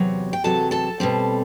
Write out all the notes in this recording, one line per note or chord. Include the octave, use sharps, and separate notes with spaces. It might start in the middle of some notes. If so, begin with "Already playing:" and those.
Already playing: E2 C3 F#3
G5
E2 C3 F#3 A4 A5
A4 A5
B2 G3 C4